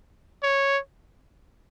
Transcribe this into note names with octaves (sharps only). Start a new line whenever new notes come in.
C#5